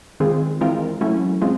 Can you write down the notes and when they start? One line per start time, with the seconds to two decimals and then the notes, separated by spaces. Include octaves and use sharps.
0.20 D#3 G#3 C4 F4 G#4
0.61 E3 G#3 C4 F4 A#4
1.01 F#3 A3 C#4 E4
1.42 G#3 C4 F4